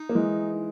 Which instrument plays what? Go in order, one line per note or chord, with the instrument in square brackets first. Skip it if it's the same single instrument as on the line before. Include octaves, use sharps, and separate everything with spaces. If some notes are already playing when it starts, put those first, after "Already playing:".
Already playing: [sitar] D#4
[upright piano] A#3
E3 G#3